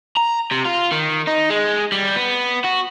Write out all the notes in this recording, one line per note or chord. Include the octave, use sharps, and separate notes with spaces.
A#5
C3
F4
D#3
D#4
G#3
G3
B3
F#4